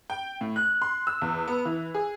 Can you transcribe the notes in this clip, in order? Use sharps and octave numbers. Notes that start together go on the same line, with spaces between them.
G5
A2
F#6
C6
E6
E2
B3
E3
G#4